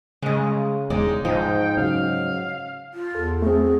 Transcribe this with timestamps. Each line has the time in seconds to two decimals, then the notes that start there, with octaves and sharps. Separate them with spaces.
0.22 C#3 G#3 D#5
0.90 E1 G#3 D#4 D5
1.25 G#2 F3 D#4 G5
1.77 C#3 F#3 F5
2.94 F4
3.15 E2 A4
3.42 A3 C4 G#4